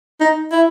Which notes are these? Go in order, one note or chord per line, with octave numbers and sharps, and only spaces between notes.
D#4
E4